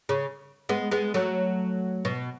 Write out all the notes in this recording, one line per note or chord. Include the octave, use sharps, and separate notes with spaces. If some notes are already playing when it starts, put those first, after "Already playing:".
C#3
G#3 B3
G#3 B3
F#3 A3
B2